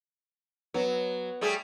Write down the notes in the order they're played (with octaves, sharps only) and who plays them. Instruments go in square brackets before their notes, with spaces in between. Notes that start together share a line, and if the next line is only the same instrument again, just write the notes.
[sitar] F#3 [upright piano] B3
[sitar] G3 A3 G#4